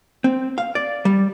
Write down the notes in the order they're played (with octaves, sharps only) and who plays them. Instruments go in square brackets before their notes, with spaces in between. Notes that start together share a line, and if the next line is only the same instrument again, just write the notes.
[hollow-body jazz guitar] C4
F5
D5
G3